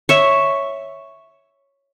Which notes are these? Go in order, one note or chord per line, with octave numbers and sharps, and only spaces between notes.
C#5 E5